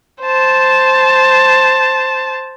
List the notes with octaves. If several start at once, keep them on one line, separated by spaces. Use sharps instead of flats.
C5 A5